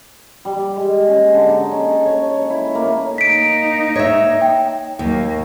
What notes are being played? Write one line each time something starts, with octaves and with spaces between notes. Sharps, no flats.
G3
G#3
C#4
D3
D#4
C#4
A4
C#5
C#5
E4
A#3
A#3 D#4 B6 D7
C#5 E5
G5
D#2 F#3 A#3